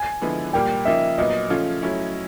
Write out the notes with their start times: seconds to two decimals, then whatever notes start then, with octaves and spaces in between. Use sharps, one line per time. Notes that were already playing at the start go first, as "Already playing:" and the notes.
Already playing: G#5
0.22 D3 F3 G#3 B3 E4
0.53 A#2 G3 A#3 G5
0.85 C#3 F3 A#3 D#4 E5
1.18 A#2 F#3 B3 D#4 D#5
1.50 C#3 F3 A3 C#4 F4
1.82 F#3 A3 C#4 E4